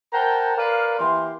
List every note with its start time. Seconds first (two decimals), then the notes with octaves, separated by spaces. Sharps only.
0.13 A#4 C5 F#5 G5 A5 A#5
0.58 A#4 B4 D5 F5
0.99 E3 A#3 G4 C6